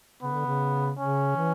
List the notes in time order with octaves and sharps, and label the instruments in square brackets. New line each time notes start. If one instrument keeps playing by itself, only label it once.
[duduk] C#3 [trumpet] B3
[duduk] D3
C#3
[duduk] C#3 [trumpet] C#4
[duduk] E3